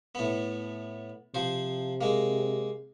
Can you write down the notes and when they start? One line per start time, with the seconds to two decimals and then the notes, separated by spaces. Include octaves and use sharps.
0.15 A2 B3
1.35 C3 F3 C5
2.01 G#3 A#3